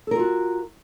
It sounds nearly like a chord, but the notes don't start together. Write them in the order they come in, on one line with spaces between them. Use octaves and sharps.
A4 A#4 F4 F#4